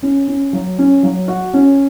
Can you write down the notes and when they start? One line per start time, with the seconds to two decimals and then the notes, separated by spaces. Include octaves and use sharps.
0.03 C#4
0.28 C#4
0.53 F#3
0.79 C#4
1.03 F#3
1.28 F#4
1.54 C#4